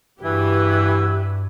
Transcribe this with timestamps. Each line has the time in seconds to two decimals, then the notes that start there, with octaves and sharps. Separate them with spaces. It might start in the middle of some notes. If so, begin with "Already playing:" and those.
0.23 G2 E3 F#4 G4 B4 E5 E6 G#6